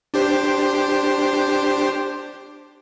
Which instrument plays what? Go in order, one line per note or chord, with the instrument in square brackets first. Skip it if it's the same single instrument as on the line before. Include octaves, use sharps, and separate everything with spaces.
[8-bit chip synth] D4 G4 C5